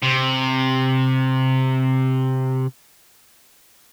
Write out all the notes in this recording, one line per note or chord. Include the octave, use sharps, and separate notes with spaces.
C3